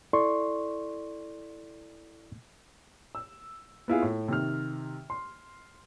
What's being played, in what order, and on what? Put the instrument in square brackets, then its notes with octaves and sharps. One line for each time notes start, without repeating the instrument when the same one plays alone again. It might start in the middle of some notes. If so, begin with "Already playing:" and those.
[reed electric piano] E4 A4 D5 C6 C#6
[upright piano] E6
B3 E4 F4 G#4
A2
C3 D#3 F6
C6